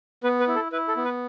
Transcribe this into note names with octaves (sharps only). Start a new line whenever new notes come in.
B3 B4
B4
E4
A4
E4 B4
A4
B3
B4